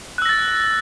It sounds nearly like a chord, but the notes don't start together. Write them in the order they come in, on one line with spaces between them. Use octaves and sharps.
F#6 E6 A#6 A6